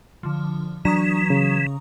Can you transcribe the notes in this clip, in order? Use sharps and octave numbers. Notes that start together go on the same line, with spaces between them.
D3 F3
E3 F#3 D4 A#5 C#6 D#6
C#3